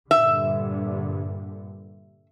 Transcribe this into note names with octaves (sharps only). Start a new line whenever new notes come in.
G2 A#2 D3 E5